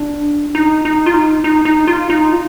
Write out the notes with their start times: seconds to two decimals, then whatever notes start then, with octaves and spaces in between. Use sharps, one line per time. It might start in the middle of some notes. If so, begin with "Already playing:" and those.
Already playing: D4
0.55 D#4
0.85 D#4
1.06 F4
1.14 D#4
1.44 D#4
1.65 D#4
1.87 F4
2.10 D#4
2.32 F4